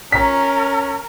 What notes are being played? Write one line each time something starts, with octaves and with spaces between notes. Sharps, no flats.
C#4 A#4 A#5 B6